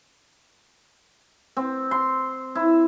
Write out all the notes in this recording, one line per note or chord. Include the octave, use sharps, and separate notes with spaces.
C4
C6
E4